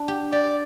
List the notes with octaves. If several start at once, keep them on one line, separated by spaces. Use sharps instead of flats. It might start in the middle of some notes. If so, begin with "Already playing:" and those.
Already playing: D4
G4
G4 D5